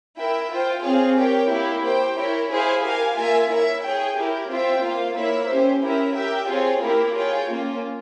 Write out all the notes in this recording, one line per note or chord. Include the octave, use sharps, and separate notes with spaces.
E4 A#4 E5 G5
F4 C5 G5
C4 F4 G#4 C#5 F5
G4 A#4 C#5 G5
A#3 E4 G4
G4 C5 G5
E4 A#4 C#5 G5
E4 G#4 C5 F5 G#5
G4 A#4 F5 G#5
A#3 F4 A#4 E5 G#5
E4 A#4 C#5 E5
G#4 C#5 G5
E4 G4 A#4
C4 F4 C5 E5 G5
A#3 F4 C5 F5
A#3 E4 A#4 C#5 E5
C#4 G4 C5
C#4 E4 G4 A#4 E5
G4 A#4 E5 G5
C4 F4 G#4 C#5
A#3 E4 G4 A#4
F4 G#4 C#5 G5
A#3 C#4 F4